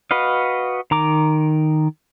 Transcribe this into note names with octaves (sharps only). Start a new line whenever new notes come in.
F#4 B4 D#5 F5
D#3 A#5 D6